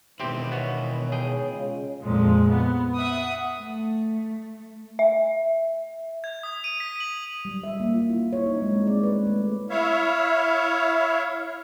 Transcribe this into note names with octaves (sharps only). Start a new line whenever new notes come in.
B2 D#3 E3 C4 E4 G4 B4 C5
B3 F#4 C#5
G#4 G5
C#3 G#3 F4
F2 A#2 F3 G#3
B3
E5 F#5 D#6
A3
E5
G#6
D#6
D#7
B6
F#7
G3
E5
A#3
F4
E4
C#5
D#4
G#3
C4
D5
B4
A3
E4 C#5 E5 F5